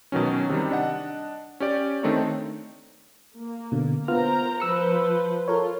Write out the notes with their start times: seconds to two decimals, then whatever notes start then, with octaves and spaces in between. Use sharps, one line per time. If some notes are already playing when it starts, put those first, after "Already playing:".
0.12 B2 D#3 F#3 C#4
0.49 C3 D#3 G3
0.71 D4 D#5 F#5
1.60 C#4 G4 D5
2.03 D#3 A3 C4 D4 D#4 C#5
3.38 A#3
3.72 B2 D3
4.08 B3 F4 A#4 C5 A#5 F6
4.60 F3 B4 C5 E6 C#7
5.48 F4 A4 A#4 C#5